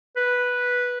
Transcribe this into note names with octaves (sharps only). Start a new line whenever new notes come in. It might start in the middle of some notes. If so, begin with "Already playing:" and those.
B4